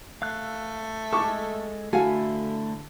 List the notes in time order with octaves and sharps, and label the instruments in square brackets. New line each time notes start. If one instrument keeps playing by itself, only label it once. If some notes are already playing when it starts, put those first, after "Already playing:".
[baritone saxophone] A3 [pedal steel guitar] F5 E6 F#6
[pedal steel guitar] G#3 A4 [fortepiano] A5 C#6 D6
[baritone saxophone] D3 [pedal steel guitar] A3 E4 [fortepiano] F#4 [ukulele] A4 F5 G#5